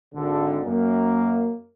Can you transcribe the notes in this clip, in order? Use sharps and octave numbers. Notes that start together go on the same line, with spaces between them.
G#1 D3
F#2 A#3